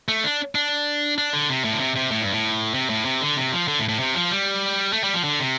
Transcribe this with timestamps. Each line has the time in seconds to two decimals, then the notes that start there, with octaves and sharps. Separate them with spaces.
0.09 A3
0.24 D4
0.55 D4
1.18 D4
1.33 D3
1.50 C3
1.65 A2
1.73 D3
1.80 C3
1.96 C3
2.11 A2
2.22 G2
2.32 A2
2.74 C3
2.90 A2
3.05 C3
3.21 D3
3.37 C3
3.52 F3
3.68 D3
3.78 A2
3.89 A2
3.99 C3
4.15 F3
4.31 G3
4.93 A3
5.04 G3
5.14 F3
5.24 D3
5.40 C3